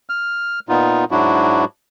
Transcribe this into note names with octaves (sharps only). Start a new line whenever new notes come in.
F6
A#2 B3 D#4 F4
G#2 F#3 D4 E4 F#4